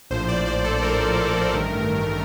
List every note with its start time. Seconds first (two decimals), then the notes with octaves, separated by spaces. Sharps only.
0.10 A#1 A2 F3 C5
0.28 D5
0.46 C5
0.64 A4
0.82 A#4
1.53 A1 G2 D#3 A3